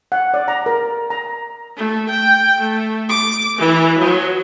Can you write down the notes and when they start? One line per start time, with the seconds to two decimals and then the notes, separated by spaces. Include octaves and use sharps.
0.12 F#5
0.34 D5
0.48 A#5
0.66 A#4
1.10 A#5
1.76 A3
2.09 G5
2.60 A3
3.09 D6
3.58 E3
3.98 F#3